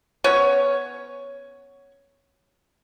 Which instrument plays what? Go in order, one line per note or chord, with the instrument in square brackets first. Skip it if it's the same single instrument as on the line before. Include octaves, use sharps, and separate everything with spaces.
[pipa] B3 C#4 C#5